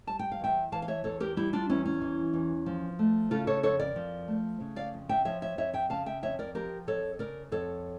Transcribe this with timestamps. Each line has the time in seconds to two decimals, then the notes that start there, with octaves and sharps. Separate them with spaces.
0.07 G3 A5
0.19 G5
0.32 F5
0.40 E2 E5 G5
0.72 E3 F5 A5
0.82 F5
0.88 C#5 E5
1.04 E2 A4 C#5
1.20 G4 A#4
1.37 G3 E4 G4
1.53 D4 F4
1.69 E2 C#4 E4
1.86 C#4
2.01 E3
2.34 E2
2.66 F3
2.99 A3
3.31 C#3 F4 A4
3.47 A4 C#5
3.63 F2 A4 C#5
3.79 A#4 D5
3.96 F3
4.28 A3
4.61 C#3
4.76 D5 F5
4.94 F2
5.09 E5 G5
5.25 F3 C#5 E5
5.42 C#5 E5
5.58 F2 C#5 E5
5.74 E5 G5
5.90 C#3 F5 A5
6.06 E5 G5
6.23 F2 C#5 E5
6.39 A#4 D5
6.55 F3 G4 A#4
6.87 F2 A4 C#5
7.19 C#3 A#4 D5
7.52 F2 A4 C#5